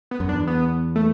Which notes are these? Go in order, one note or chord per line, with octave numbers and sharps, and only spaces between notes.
B3
F#2
D4
E2
B3
A3